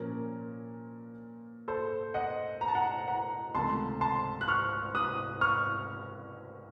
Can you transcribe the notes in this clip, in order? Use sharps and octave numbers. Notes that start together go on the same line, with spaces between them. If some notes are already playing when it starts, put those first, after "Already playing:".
Already playing: A#2 F3 A#3 C#4 A#4
A4 C5
D#5 F#5
A#5
A5
F#5 A#5
F#5 A#5
C#2 C3 D#3 A3 A5 C6
A5 C6
F#6
C#6 F6
D#6 F#6
C#6 F6